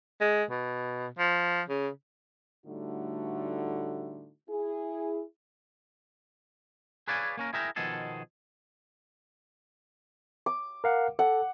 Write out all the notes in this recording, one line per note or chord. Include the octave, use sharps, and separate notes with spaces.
G#3
B2
F3
C#3
A2 D3 G3 A3 D#4 F#4
E4 G#4
G#4 B4 C#5 D5 F5 G#5
A#3 C#4 A#4
E4 G#4 A#4 E5 G5 A#5
B2 D#3 F3 B3 G#4 A4
D6
A#4 F5 F#5
A4 F#5